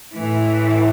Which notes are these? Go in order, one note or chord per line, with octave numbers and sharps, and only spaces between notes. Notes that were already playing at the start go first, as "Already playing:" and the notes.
A2 E3 A3